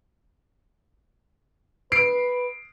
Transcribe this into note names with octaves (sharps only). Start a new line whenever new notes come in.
B4 C7 D7